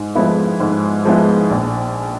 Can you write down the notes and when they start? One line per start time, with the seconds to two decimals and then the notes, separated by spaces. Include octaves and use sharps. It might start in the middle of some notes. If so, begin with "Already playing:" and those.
Already playing: G#2
0.15 F3 G#3 B3 E4
0.60 G#2
1.05 F3 G#3 B3 E4
1.50 A#1